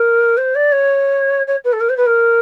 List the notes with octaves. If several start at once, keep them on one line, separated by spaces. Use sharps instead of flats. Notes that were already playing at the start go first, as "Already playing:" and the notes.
Already playing: A#4
C5
D5
C#5
C#5
B4
A4
A#4
C5
B4
A#4